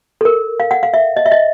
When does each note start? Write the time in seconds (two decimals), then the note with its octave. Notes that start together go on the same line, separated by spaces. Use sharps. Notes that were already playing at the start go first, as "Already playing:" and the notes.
0.21 A4
0.25 A#4
0.60 F5
0.71 F#5
0.83 F5
0.94 E5
1.17 D#5
1.26 E5
1.32 D#5